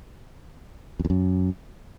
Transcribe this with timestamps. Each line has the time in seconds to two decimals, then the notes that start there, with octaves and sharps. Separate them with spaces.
0.99 F2
1.05 E2
1.10 F#2